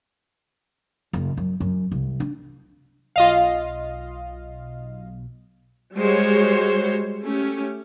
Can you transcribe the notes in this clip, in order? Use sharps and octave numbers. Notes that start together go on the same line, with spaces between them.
F#1
F#2
F#2
C2
D4
B1 F4 D#5 F5
G3 G#3 F#4 C5 C#5
A3 C#4 G4